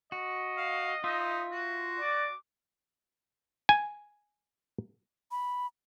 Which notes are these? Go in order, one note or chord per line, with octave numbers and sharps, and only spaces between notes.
F#4 D#5
F5
D#4 F4 E5
F#4
D5 D6
G#5
B5